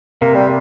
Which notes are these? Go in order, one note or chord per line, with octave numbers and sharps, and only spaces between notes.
C3 A#3
G3